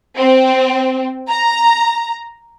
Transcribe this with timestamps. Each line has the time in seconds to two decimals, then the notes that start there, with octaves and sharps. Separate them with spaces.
0.17 C4
1.28 A#5